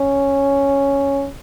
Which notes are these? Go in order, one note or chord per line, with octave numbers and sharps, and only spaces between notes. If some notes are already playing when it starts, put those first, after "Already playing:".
Already playing: C#4